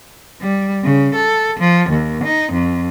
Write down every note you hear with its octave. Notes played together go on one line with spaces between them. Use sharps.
G3
C#3
A4
F3
D#2
D#4
F2